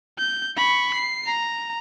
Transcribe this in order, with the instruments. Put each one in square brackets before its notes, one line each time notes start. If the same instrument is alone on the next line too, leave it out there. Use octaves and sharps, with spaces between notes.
[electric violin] G6
B5 C#6
C7
A#5